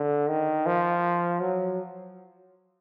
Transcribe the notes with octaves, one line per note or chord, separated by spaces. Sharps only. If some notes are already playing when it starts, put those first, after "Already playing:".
Already playing: D3
D#3
F3
F#3